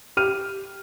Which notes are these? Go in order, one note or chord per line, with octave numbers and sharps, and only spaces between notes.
G4 F6 D#7